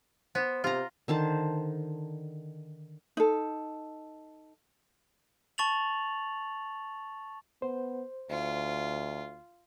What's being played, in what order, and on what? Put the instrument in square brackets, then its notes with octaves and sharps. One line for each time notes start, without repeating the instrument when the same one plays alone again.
[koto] B3 [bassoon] C5
[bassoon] C3 [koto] F4 A#5
[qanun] D3 D#3 C5 A5
[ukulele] D#4 A4
[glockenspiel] A5 C#6 A6 F7 F#7
[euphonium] B3 [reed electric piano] C5
[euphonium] D2 [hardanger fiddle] F4